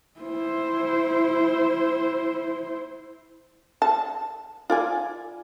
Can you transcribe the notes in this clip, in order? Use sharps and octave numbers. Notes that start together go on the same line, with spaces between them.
E4 C5
A5
F4 D5 G#5